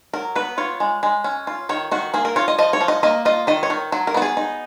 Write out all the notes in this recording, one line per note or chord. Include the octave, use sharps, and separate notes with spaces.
F#3 A#4
B3 B4
F4 C#5
G#3
G#3
C#4
F4
D#3 C#5
D#3 F#4
A#3 G#4
A#4
F4 C#5
D#5
F3 D#5
C#5
F3
D#5
A#3 D#5
F4 D#5
D#3 D#5
C#5
D#3
F#3
A#4
B3 F#4
G#4
D#4